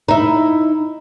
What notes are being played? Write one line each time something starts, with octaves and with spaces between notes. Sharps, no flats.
D#4 E4